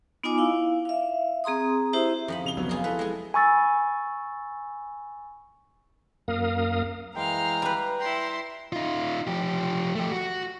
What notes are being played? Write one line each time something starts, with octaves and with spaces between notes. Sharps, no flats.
B3 D#4 F4 D#5 G#5 D6
E4 F5
E5 F5
C4 G#4 A#5 C6 D#6
E4 G4 C5 E5
F2 D#4 B5
C#3 F7 G7
F1 F#3 B3
F4 G#4 A#4
E4 A4 B4
G#3 G#4
G#5 B5 C#6 E6 A6
F#2 A#3 A#4 F5 D#6
E3 G#3 F5 G5 A#5 F6
G3 B4
E4 G5 A#5 C6
D#4 F4
F3 G4
A3 G4
F#4